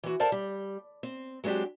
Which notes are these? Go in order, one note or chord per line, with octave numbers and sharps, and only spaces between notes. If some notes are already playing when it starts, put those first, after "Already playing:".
E3 F#4
A4 A#4 C5 D5 F5 A5
G3
C4
F#3 G#3 C4 D4 G4